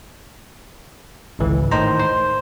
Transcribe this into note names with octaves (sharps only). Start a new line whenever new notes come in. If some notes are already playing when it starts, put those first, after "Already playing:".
G#1 C#2 E3
A2 D#3 D#4 C5 A#5
C5